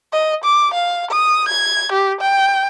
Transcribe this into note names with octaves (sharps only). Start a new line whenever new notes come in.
D#5
D6
F5
D#6
G#6
G4
G5